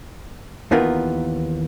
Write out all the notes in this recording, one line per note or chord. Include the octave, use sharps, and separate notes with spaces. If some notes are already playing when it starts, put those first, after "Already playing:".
D#2 D#3 E3 B3 F4 A#4